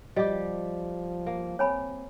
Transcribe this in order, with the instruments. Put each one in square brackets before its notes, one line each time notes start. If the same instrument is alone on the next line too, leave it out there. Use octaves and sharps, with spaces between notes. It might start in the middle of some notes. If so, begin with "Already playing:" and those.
[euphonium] F3 [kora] G3 G4 [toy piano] D#5
[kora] A#3
[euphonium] C4 [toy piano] C#5 G#5 B5